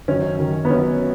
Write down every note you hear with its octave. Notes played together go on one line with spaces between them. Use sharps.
F#2 D#3 C#4
F#2 D#3
B3
F#2 D#3 C#4